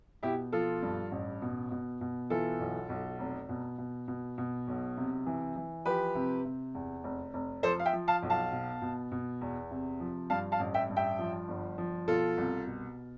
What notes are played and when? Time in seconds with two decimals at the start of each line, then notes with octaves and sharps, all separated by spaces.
0.23 B2 E4 G4
0.52 F3 F4 A4
0.82 G2
1.12 A1
1.42 B2
1.71 B2
2.01 B2
2.30 E3 F4 A4
2.60 B1
2.89 B1
3.19 F1
3.49 B2
3.78 B2
4.08 B2
4.38 B2
4.68 B1
4.97 C3
5.26 E3
5.56 E3
5.86 F3 G4 B4
6.15 C3
6.45 C3
6.75 E2
7.04 F1
7.34 F1
7.63 F3 A4 C5
7.80 F5
7.85 E5 G5
7.93 F3
8.08 F5 A5
8.22 B1
8.30 F5 A5
8.52 B2
8.82 B2
9.11 B2
9.41 E2
9.71 C3
10.00 F3
10.30 G2 F5 A5
10.52 F5 A5
10.59 A1
10.74 E5 G5
10.89 G2
10.96 E5 G5
11.19 F3
11.48 G1
11.78 F3
12.07 B2 F4 A4
12.37 C2
12.67 B2